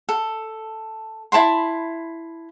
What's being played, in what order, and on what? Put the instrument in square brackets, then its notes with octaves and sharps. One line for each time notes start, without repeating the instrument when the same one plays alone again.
[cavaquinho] A4
E4 A5 B5 C6